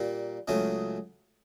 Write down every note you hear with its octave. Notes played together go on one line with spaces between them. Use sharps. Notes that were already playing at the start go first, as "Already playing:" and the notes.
Already playing: A#2 G3 A#3
C#2 C#3 F#3 A3 C#4